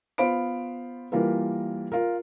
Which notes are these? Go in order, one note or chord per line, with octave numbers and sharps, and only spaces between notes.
B3 F4 C5 F5 B5 D7
E3 G3 A#3 F4 A#4 B4
F4 A#4